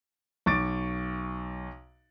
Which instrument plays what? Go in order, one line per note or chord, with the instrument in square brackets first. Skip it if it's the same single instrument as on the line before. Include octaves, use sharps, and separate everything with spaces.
[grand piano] B1 C#6 D6 A6 D7